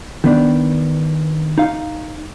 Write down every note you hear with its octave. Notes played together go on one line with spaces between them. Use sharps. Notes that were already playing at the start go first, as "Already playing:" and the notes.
D#3 B3 D4
D#4 F5